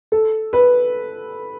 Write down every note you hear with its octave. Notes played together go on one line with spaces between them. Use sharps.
A4
B4